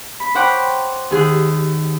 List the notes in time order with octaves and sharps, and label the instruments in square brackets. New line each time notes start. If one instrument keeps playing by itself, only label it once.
[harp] B5
C5 C#5 F#5 G5 B5 D6
D#2 G#4 F#5